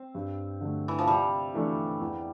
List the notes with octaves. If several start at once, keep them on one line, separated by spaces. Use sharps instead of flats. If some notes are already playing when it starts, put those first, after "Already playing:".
Already playing: C4
G2
D3 A3
E3
F3
C3 G3
E3 A3 D4 A4
E2